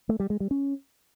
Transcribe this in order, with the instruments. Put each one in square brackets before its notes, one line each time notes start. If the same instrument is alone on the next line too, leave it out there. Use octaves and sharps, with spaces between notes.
[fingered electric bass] A3
G3
G#3
G3
C#4